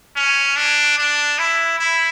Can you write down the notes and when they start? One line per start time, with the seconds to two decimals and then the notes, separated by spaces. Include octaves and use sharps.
0.16 C#4
0.56 D4
0.98 D4
1.38 E4
1.79 E4